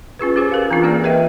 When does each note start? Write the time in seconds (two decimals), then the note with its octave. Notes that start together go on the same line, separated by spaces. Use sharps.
0.19 C#4 F4 G#4 B4
0.36 C#4 G4 G#4 C5
0.52 C#4 A#4 F5
0.71 E3 C4 D4 F4
0.83 A#3 G4 G#4 D5
1.04 A#4 B4 D#5 E5 G5